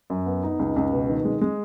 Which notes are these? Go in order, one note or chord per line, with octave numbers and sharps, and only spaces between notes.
F#2
B3
D#4
C#2
C#2
B2
D#3
G#3
G#3